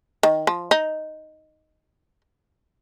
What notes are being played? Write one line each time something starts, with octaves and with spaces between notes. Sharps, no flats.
D#3
F3
D#4